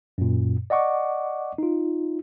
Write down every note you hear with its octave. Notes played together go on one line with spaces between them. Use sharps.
F#2 A#2
D5 D#5 F#5 C#6 D6
D#4 F4